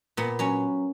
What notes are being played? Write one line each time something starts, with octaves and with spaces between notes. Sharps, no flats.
A#2 B3
F#3 C#4